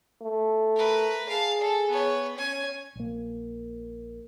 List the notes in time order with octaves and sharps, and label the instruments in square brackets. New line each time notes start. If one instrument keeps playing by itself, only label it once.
[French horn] A3
[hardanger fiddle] A#4 B4
[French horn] G#4 [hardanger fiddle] F5 A5
[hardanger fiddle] A4
B3 C#5
C#4 G#5
[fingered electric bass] A#1 A#3